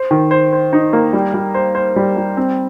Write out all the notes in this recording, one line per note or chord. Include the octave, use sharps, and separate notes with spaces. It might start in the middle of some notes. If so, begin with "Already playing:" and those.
Already playing: C5
D#3
C5
C5
D#4
A#3
G3
G3
C5
C5
G3
G3
C4